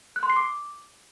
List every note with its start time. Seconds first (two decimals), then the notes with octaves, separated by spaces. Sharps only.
0.16 F#6
0.23 C6
0.30 C7
0.36 D6